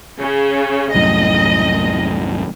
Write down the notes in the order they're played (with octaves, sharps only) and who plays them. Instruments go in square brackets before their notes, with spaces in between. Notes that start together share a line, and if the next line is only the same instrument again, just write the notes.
[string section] C#3
[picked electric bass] C2 F#2 A2 [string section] D#5